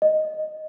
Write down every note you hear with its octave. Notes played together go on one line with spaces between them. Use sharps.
D#5